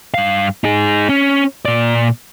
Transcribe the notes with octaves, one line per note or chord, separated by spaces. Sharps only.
G2 F5
D#4 G#4
C#4
A#2 D5